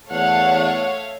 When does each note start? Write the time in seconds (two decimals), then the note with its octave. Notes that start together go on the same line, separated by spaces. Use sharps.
0.11 E2 A3 C#5 F5 F#5